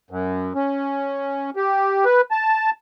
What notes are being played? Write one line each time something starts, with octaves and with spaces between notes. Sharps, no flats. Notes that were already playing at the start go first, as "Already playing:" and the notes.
F#2
C#4
G4
B4
A5